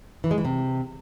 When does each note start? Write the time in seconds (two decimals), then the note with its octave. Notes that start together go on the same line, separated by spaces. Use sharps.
0.24 E3
0.31 G#3
0.38 E3
0.45 C3